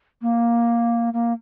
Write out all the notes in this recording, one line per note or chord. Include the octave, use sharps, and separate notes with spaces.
A#3
A#3